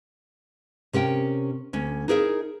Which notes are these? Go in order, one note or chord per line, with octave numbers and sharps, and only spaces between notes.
C3 C#4 A#4 G5
D2 C#4
D#4 E4 G#4 A#4 C5 E5